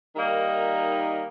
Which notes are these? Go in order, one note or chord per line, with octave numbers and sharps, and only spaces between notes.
D#3 G3 A#3 D#4